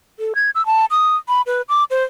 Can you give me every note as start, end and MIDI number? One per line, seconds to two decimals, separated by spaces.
0.19 0.33 69
0.35 0.50 92
0.55 0.65 88
0.66 0.85 81
0.91 1.16 87
1.29 1.41 83
1.47 1.62 71
1.69 1.84 86
1.90 2.03 72